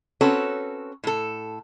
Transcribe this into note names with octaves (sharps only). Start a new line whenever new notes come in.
C4 C#4 F#4 A4 B4 C#5
A2 A4